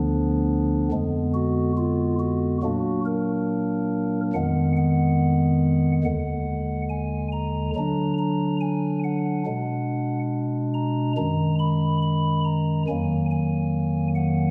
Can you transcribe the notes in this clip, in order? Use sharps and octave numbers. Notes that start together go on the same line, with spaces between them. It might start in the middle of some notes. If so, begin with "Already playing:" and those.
Already playing: D2 D3 F3 B3 D4
F2 D3 G#3 B3
F#4
F4
F#4
A#2 F#3 A#3 D4 F#4
A#4
F2 D#3 G#3 B3 F#5
F#5
D#2 D3 G#3 F#5
G#5
A#5
D3 F#3 D4 A#5
A#5
G#5
F#5
B2 G#3 D4
A#5
F#2 D#3 G#3 A#5
B5
B5
A#5
F2 D#3 F#3 A#3 G#5
G#5
F#5